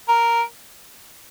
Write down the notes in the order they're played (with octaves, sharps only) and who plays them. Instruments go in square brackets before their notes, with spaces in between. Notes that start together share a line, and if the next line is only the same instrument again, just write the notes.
[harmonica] A#4